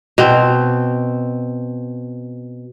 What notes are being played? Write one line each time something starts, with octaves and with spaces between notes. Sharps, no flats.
B2 C4